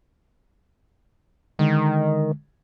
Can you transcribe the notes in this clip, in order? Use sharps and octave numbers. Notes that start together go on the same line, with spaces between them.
D3 D#3 G#3